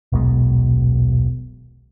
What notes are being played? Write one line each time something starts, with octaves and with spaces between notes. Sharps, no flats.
D#1 B1 B2 G#3